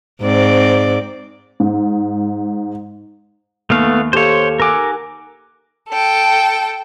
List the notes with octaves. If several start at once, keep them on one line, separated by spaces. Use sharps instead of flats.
G#2 C4 D5
G#2
D#2 A3 B3 F5
G4 A4 C5 C#5 F5
A#4 F#5 G#5 D6 E6
A4 G5